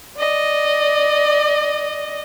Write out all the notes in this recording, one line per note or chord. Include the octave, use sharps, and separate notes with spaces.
D5 D#5